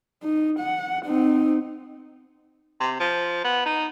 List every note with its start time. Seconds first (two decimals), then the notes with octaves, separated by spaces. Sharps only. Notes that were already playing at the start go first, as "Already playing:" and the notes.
0.23 D#4
0.59 F#5
1.05 C4 D#4
2.80 C3
3.00 F3
3.44 B3
3.66 D#4